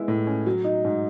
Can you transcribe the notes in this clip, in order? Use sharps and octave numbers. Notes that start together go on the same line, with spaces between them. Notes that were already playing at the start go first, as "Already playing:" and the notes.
Already playing: G#3 B3 E4
A2
C#4
F#3
D#4
G#2